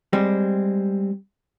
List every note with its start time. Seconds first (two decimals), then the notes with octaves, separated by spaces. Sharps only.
0.13 G3 G#3 C4